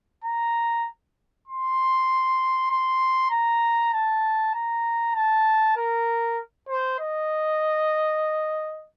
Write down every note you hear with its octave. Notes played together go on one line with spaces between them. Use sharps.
A#5
C6
C6
A#5
A5
A#5
A5
A#4
C5
D#5